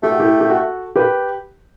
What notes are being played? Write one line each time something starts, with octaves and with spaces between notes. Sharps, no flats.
A3 G4
F#4
E4 G4
G4
F#4 A4
G4 B4